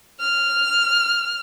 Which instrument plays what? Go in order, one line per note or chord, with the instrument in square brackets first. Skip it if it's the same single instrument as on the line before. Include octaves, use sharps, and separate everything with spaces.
[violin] F6